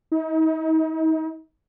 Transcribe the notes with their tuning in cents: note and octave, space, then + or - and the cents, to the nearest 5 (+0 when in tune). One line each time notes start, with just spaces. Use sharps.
D#4 +40